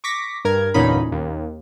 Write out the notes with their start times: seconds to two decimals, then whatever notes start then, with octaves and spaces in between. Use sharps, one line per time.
0.04 C#6 D6 A#6 B6
0.45 G2 A#4 G#6
0.74 G1 E2 A#2 C#4 D#4 B5
1.12 D#2